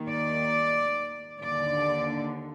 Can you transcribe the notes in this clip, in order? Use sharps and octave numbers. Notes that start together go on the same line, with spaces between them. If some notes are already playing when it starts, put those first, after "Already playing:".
Already playing: D#2 D#3
D5
D#2 D3 D5